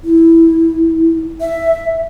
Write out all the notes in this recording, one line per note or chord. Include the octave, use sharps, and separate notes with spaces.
E4
E5